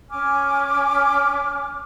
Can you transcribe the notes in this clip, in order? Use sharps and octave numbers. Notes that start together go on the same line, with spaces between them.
C#4 G#5 D6 F6